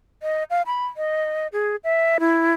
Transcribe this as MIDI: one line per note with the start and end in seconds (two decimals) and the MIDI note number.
0.23 0.44 75
0.50 0.62 77
0.66 0.85 83
0.97 1.47 75
1.53 1.76 68
1.84 2.18 76
2.20 2.54 64